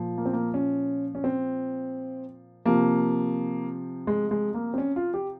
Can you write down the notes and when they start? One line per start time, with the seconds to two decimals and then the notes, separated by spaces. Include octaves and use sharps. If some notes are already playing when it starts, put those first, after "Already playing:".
Already playing: A#2 F3
0.18 A#3
0.26 C4
0.33 A#3
0.54 C#4
1.15 C#4
1.24 C4
2.66 C3 F3 A#3
4.07 G#3
4.31 G#3
4.54 A#3
4.74 C4
4.78 C#4
4.96 F4
5.14 G4